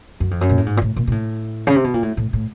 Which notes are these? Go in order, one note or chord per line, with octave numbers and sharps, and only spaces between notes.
F#2
F2
F#2
A#2
A2
G#2
A#2
A2
A#2
A#2
A2
C#3
C3
B2
A#2
A2
A2
A2